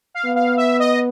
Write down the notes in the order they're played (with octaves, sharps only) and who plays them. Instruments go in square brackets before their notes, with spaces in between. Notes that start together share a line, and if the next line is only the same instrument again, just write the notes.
[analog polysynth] F5
[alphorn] B3
[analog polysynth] F5
E5
D#5